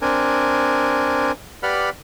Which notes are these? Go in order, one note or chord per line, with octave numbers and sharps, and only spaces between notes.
C4 D4 A#4 G#5
G4 B4 D5 F#5 B5 F6